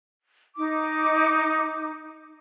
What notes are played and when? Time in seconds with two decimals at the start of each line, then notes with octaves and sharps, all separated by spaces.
0.57 D#4 D6